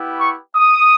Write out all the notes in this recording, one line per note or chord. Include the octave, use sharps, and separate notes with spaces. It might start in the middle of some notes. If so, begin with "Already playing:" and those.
Already playing: B3 E4 G4
C#6
D#6